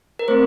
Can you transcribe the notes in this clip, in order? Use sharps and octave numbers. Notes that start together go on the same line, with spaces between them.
A#4
A3 C4 C5